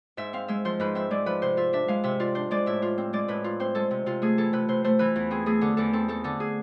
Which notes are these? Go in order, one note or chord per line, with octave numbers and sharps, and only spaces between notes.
G#2 E5
C4 F5
G#3 E5
F3 C5
G#2 B4
C4 E5
G#3 D5
F3 B4
C3 C5
F4 E5
D4 E5
G#3 F5
C3 E5
F4 D5
D4 C5
G#3 D5
A2 E5
F4
C4
G#3 D5
A2 B4
F4
C4 C5
G#3 A4
C3
C3 F4
A3 G#4
E3 A4
C3 B4
C3 C5
A3 C5
E3 B4
E2
C4 G#4
A3 G#4
D3 A4
E2 A4
C4 A4
A3 A4
D3 A4
G#4